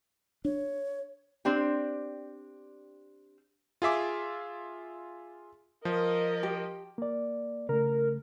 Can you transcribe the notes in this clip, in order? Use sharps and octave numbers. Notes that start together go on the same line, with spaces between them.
D4 C#5
C4 D4 G4
F4 G#4 E5 D6
F3 A#4 D#5
G4
A#3 D5
C#3 A3 A#4